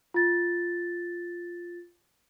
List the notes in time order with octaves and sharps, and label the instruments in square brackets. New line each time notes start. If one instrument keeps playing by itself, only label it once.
[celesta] F4 A6